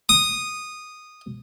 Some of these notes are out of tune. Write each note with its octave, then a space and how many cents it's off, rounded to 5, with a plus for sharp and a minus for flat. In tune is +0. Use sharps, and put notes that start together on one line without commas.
D#6 -10